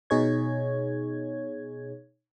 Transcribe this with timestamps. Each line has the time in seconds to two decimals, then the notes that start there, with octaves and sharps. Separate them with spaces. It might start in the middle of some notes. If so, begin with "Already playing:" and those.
0.10 B2 D#4 G#4 C#5 G#6